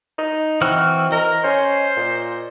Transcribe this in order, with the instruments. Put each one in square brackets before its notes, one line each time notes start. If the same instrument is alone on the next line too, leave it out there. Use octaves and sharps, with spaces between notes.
[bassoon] D#4
[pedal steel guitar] E3 F#4 F6 [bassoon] C4
[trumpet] A#4 [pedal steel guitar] D#5
[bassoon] C#4 [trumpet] C5
[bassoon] A#2